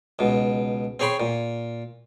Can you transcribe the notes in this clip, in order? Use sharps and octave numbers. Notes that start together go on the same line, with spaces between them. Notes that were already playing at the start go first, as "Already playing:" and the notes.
C#2 B2
C4 G#4 C#5 G5 B5 C6
A#2